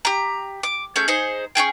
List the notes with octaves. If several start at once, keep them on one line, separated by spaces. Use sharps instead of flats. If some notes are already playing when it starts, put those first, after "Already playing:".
G4 A#5
D6
A3 C#4 G#4 G6
D#4 G#4 C5
C#4 E4 G#4 G5